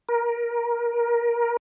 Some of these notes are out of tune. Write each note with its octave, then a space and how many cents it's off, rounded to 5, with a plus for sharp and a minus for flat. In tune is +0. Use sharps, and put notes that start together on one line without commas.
A#4 +20